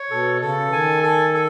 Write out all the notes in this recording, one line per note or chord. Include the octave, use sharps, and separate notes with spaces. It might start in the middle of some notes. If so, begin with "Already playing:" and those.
Already playing: C#5
B2 A4
C#3 A4
E3
D#3 G#5
A4
A4